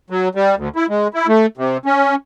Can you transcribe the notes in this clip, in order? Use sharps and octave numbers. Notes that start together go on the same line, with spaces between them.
F#3
G3
D2
E4
G#3
E4
A3
C3
C#4